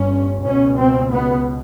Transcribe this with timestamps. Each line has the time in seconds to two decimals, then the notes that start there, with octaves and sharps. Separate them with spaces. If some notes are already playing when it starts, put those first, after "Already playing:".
Already playing: G1 G2 C#4
0.45 C#2 B2 C#4
0.78 C4
1.11 B3